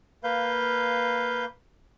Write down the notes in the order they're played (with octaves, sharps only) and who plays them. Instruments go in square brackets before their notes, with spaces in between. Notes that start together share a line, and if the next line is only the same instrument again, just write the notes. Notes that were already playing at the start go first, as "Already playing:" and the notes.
[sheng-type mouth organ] A#3 B4 F5 G6